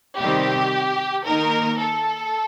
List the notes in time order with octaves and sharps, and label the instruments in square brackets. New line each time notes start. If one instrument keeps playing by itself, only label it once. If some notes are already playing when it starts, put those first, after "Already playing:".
[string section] C3 D#3 G3 C4 G4
D#3 A#3 D#4 A#4
A4